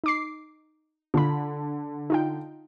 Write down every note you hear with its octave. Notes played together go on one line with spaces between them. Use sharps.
D#4 D6 C7
D3 F4 B5
D#4 F4 G5